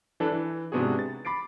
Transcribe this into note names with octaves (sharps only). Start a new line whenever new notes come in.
E3 D4 A4 B4
E3
G#2 C3 B3 D4 F#4 G#4
A6
B5 D6 A6 C7 D7